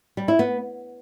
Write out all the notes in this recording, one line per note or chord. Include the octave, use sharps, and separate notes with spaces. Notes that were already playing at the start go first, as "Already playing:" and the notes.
G3
E4
B3